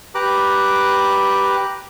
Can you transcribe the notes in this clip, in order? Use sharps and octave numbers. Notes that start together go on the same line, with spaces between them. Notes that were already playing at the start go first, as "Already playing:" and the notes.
G4 B4 A#5 D6 F#6